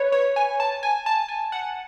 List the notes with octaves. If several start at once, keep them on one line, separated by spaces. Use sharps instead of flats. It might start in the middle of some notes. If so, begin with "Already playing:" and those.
Already playing: B4 C#5
C#5
G#5
A5
G#5
A5
G#5
F#5